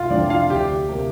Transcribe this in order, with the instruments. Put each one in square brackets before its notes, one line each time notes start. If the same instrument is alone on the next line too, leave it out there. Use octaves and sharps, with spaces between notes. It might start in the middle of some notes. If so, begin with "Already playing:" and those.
Already playing: [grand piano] F1 F4 F5
F2 F3 C4 D4 D5
F4 F5
D2 G4 G5
C3 A#3